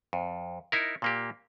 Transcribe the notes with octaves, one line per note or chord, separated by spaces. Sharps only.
F2
D#4 E4 A#4
A#2 A#3 G4